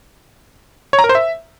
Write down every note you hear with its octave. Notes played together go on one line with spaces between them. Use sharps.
C#5
A#5
A#4
C5
E5